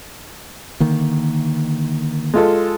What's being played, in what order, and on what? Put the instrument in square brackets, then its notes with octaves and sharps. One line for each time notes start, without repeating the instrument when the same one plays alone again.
[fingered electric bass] D3 D#3 A#3
[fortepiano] G#3 F4 A4